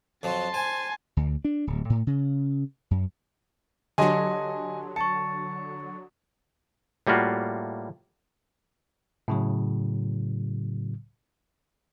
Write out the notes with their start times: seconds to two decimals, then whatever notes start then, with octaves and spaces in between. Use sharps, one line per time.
0.23 F2 F3 F#3 A5 C6
0.54 C5 G#5
1.17 D2
1.45 D4
1.67 D1
1.90 A2
2.07 C#3
2.91 F#2
3.98 D3 F#3 G4 D#5 G#5 A5 C6
4.96 A5 C#6 A6 C#7
7.07 A2 G3 A#3 F4 F#4
9.28 A2 C#3 F#3